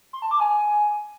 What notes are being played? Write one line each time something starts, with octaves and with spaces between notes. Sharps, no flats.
C6
A5
D6
G#5